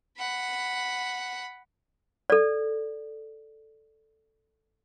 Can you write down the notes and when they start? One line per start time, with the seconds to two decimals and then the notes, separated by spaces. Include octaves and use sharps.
0.18 F#5 B5
2.30 A4 D5